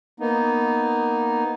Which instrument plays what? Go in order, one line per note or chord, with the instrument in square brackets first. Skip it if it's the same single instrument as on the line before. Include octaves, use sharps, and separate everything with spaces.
[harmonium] A#3 B3 D#4